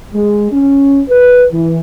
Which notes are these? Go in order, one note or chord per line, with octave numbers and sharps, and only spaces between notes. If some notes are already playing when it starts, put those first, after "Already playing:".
G#3
C#4
B4
E3